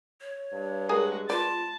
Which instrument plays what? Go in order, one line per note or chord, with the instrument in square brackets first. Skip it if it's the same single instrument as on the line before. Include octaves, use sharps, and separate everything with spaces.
[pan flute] C#5
[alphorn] G2
[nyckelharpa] G#3 F#4 [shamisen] G#4 A#4 G#5
[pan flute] F4 [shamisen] B4 D5 [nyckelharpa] A5